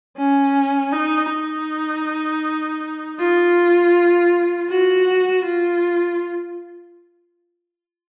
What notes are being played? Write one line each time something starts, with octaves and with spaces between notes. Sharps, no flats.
C#4
D#4
D#4
F4
F#4
F4